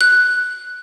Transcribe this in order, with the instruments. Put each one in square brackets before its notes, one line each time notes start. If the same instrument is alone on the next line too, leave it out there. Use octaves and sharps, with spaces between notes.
[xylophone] F#6